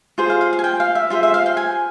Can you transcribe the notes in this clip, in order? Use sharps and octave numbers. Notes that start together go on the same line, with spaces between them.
F4 G#4 C5
F5
F5
F5
G#5
G5
F5
E5
F4 G#4 C5 E5
E5
F5
G5
G#5